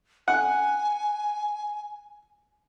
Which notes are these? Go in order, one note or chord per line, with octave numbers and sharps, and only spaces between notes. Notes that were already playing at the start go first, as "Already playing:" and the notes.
F#5 G#5